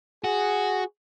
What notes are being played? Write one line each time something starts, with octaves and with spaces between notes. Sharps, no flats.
F#4 G#4